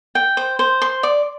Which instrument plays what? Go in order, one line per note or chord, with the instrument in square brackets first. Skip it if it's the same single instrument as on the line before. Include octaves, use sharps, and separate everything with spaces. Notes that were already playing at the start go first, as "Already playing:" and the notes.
[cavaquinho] G5
C5
C5
C6
D5